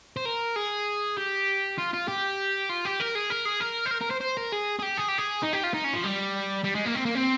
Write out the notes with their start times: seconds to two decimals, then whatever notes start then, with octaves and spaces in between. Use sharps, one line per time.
0.16 C5
0.25 A#4
0.56 G#4
1.17 G4
1.78 F4
1.93 F4
2.08 G4
2.69 F4
2.85 G4
3.00 A#4
3.15 G#4
3.30 A#4
3.46 G#4
3.61 A#4
3.86 C5
3.91 A#4
4.01 A#4
4.11 C5
4.21 C5
4.37 A#4
4.52 G#4
4.79 G#4
4.82 G4
4.97 G#4
5.08 G4
5.18 G#4
5.43 D#4
5.53 G4
5.64 F4
5.74 D#4
5.84 C#4
5.94 F3
6.04 G3
6.64 G3
6.75 G#3
6.85 A#3
6.95 C4
7.06 A#3
7.15 C4